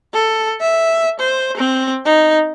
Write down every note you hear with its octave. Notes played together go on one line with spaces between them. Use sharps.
A4
E5
C5
C4
D#4